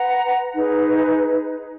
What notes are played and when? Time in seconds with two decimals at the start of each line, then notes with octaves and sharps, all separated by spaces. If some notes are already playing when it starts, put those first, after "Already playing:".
Already playing: B4 F#5 A#5
0.56 D#4 G#4 B4